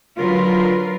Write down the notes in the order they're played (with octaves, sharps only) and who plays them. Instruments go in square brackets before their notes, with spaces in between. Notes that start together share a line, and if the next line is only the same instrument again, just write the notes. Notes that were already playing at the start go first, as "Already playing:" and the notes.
[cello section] D3 F#3 F4 A#4 B4